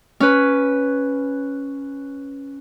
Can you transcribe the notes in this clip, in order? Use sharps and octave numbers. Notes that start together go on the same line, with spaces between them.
C#4 B4